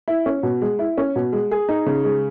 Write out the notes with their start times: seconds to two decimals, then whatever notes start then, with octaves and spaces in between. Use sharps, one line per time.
0.08 E4
0.26 C#4
0.43 B2
0.61 G#3
0.79 E4
0.98 C#4
1.16 B2
1.33 G#3
1.51 G#4
1.69 D#4
1.86 C#3
2.04 G#3